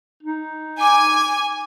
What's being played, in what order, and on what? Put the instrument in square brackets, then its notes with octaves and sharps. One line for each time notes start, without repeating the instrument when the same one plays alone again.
[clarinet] D#4
[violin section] G#5 [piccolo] D6